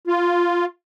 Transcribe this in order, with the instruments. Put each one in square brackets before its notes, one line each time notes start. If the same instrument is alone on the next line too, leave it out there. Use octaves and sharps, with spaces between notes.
[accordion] F4